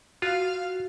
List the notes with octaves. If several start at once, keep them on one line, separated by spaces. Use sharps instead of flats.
F4 F#4 F5